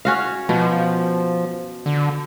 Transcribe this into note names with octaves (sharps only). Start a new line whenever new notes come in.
C#4 F#4 F5
B2 F3
D3